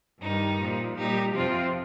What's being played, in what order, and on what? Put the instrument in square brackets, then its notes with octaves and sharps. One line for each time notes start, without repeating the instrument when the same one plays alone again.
[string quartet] G2 D#3 G3 D#4
A#2 F3
A#2 G3 D#4 G4
F2 C3 F3 C4 F4